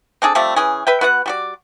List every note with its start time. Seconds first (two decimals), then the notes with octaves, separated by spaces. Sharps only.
0.22 C4 D4 G#4 A4
0.35 F3 G3 A3 C4
0.56 E3 C#4 G#4
0.87 B4 E5 G5
1.01 B3 F#4 B4 F#5
1.26 G3 F#4 D5